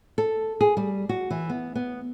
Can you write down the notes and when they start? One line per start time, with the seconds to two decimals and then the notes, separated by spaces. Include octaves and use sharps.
0.18 A4
0.61 G#4
0.77 G3
1.09 F#4
1.30 E3
1.50 B3
1.75 B3